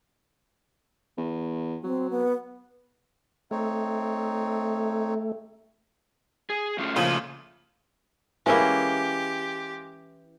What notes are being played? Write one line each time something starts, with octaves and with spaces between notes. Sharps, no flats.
E2
F#3 C4
B3
A3 C4 D#4 C#5
G#4
A3 C#4 F4
A#2 C#3 F3
E3 G#3 A#3 C#4 E4 G4